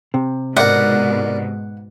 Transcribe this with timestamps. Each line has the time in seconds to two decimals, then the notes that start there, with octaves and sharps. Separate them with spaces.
0.14 C3
0.57 G#2 B2 D4 A#4 F#5